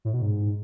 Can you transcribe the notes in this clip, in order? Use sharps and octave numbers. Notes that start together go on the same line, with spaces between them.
A2
B2
G#2